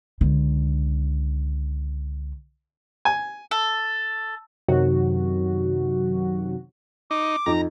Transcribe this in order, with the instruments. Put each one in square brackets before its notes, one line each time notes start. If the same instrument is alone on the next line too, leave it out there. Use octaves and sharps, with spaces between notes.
[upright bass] C#2 D3
[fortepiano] G#5
[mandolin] A4
[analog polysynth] F#2 C3 D#3 F#3 F#4
[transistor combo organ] D#4 [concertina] D6
[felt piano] F2 D#4 [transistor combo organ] A#5